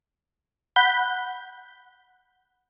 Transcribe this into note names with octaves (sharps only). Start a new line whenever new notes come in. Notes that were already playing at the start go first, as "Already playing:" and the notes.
F#5 B5 G6